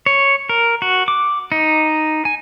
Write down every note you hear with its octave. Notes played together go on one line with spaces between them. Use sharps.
C#5
A#4
F#4
D6
D#4
G#5